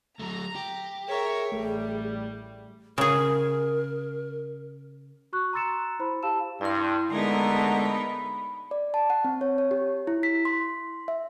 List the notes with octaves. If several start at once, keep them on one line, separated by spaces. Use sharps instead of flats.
F#3 A3 A#5
G4
G#4 A#4 C#5 E5
A1 G3 A3
C#3 G#4 A#4
F#4 C#6 F#6
A#5 C6 E6 A6 C#7 E7
E4 C5 B5
G4 F5 A5 E6 E7
G2 E4 C6
D3 G#3 A3 B3 D#4 G#4 A#4
B5
D5
A5
F#5
C4
C#5
C#5
G4
E4
B6
C6
E5